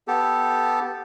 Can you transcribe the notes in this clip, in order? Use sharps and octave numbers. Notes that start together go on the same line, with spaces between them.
B3 G4 A4